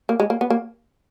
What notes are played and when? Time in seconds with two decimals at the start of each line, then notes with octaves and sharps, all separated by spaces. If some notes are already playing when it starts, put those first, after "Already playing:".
0.09 A#3
0.20 G#3
0.30 A#3
0.41 B3
0.50 A#3